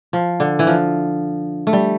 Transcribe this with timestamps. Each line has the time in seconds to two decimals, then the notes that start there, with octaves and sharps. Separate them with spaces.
0.13 F3
0.40 D3
0.59 E3
0.67 F3
1.67 A3
1.73 G3